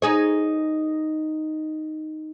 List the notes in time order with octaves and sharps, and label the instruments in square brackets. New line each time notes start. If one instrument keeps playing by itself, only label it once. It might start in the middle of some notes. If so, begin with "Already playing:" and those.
[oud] D#4 G#4 C#5